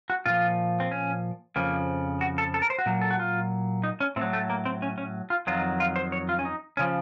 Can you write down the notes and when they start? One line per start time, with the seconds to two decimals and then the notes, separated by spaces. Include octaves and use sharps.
0.10 F#4
0.26 A#2 F3 F4
0.80 C4
0.91 C#4
1.56 F2 C#3 F3 A#3
2.21 F#4
2.38 A4
2.54 A4
2.62 A#4
2.70 C5
2.78 F#4
2.86 A#2 F#3
3.01 A4
3.11 F#4
3.20 F4
3.84 D#4
4.00 C#4
4.16 A2 C4
4.21 F#3
4.33 A3
4.50 A#3
4.65 C4
4.82 C#4
4.98 C#4
5.30 F4
5.47 F2 D#3 F#3 F4
5.80 F4
5.96 C5
6.12 C#5
6.29 F4
6.39 C#4
6.45 D#4
6.77 C#3 F3 C#4